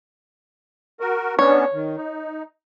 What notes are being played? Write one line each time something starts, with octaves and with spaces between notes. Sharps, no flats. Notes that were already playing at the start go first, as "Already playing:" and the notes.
F#4 A#4
B3 C#4 D4 C#5
D#3
D#4